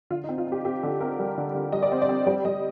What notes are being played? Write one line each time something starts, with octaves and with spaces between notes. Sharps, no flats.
D3 F4
D#4
C4
F4
C4
G4
C4 G4
D3 A4
C4 A#4
G3
D3
D3
G3 D#5
D5
C4 C5
D5
C4
G3 D5
G3 D#5